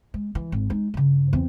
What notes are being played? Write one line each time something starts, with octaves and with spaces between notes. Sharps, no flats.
G#3
E3
G#1
G#3 D#4
G2 C#3
E2 C4